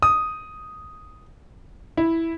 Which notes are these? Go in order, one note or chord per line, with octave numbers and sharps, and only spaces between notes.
D#6
E4